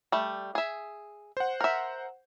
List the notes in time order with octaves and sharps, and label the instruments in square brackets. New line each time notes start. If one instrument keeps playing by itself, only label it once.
[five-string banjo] G3 A3
G#4 E5
[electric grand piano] C5 F#5
[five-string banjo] A#4 E5